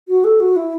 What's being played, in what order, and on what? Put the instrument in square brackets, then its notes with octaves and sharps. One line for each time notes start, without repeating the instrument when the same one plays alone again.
[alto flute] F#4
A4
F#4
E4